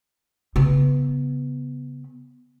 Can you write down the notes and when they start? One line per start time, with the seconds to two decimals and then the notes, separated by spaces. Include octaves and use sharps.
0.56 C#3 B3